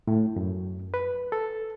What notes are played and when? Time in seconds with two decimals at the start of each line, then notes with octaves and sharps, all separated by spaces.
0.08 A2
0.36 F#2
0.94 B4
1.32 A4